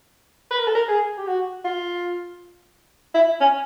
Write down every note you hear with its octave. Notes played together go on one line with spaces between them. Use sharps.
B4
A#4
A4
A#4
G#4
G4
F#4
F4
E4
C#4